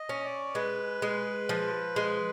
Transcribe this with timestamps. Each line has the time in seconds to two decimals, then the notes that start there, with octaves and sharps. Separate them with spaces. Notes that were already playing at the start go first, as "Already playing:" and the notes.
Already playing: D#5
0.09 C#4
0.24 D5
0.55 G#3 B4
1.02 G#3
1.49 F3
1.96 G#3